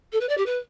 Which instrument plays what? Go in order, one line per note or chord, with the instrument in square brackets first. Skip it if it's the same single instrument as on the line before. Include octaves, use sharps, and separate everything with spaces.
[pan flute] A4
B4
D5
G4
B4